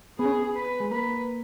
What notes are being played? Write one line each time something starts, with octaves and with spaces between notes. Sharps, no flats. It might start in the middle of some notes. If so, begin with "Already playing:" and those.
B3 G#4
C#4
B3
B4
G#3
A#3 B4